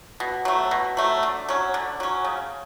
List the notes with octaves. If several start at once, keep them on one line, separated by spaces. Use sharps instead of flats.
B2
F#3 A3
B2
F#3 A3
D3
F#3 C#4
D3
F#3 C#4
C#3